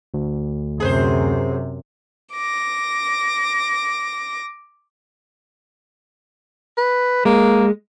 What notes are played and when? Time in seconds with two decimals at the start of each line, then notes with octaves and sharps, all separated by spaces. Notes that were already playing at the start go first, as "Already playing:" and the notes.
0.14 D2
0.80 F#2 C3 G#4 B4 C5
2.33 D6 A#6
6.78 B4
7.25 G#3 A#3